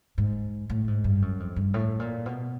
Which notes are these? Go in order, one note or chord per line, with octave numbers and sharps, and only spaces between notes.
G#2
A2
G#2
G2
F#2
F2
G2
A2
A#2
B2